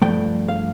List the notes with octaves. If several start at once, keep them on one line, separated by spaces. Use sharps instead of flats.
G2 F3 A3 G5
F5